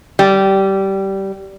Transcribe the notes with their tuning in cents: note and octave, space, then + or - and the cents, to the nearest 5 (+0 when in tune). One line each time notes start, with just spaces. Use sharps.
G3 -15